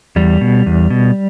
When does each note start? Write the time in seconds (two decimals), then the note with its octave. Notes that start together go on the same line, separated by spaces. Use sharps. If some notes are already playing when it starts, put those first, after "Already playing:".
0.16 E2 G3
0.41 B2
0.66 E2
0.90 B2